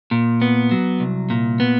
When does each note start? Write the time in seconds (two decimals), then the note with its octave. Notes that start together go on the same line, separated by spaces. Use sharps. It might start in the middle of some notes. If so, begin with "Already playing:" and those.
0.11 A#2
0.42 B3
0.71 F#3
1.00 C2
1.30 A#2
1.60 B3